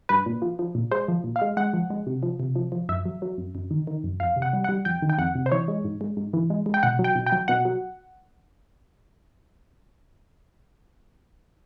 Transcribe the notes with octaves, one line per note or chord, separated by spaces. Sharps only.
G2 B4
A#2
F3
F3
A#2
G#3 C5
F3
A#2
F5
G#3
G#3 F#5
F3
G#3
C3
F3
C3
F3
F3
F#2 E5
F#3
F#3
F#2
F#2
D#3
D#3
F#2
F2 F5
C3
F#5
G3
G3 F#5
F2 G5
D#3
G5
F2 F#5
C3
C5
E3 C#5
G#3
G#2
G#3
G#2
E3
G#3
G#3
G5
B2 F#5
F#3
G5
B2
G5
F#3
B2 F#5
F#3